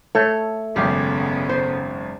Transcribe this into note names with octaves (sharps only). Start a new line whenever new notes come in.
A3 A4 C#5
G#1 F#2 C#3 B3 G4 G#4 F5
C5